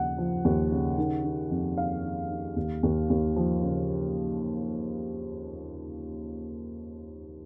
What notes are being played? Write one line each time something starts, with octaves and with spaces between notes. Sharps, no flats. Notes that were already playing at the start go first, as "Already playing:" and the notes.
Already playing: D#2 C#3 F3 F#5
F3
D#2
C#3
D#3
D#3
F2
D#3 F5
D#3
D#3
D#2
D#2
D#2
F3
C#3